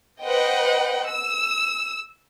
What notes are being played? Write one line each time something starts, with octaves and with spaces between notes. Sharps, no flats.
B4 C5 D#5 F#5 G5
E6